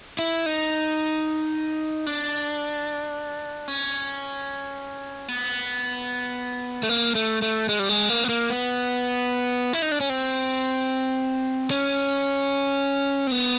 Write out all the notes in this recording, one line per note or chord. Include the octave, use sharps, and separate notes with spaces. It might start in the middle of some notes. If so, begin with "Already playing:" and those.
E4
D#4
D4
C#4
B3
A3
A#3
A3
A3
G#3
G3
G#3
A#3
B3
A#3
B3
E4
D#4
D4
C#4
C4
C#4
C4
B3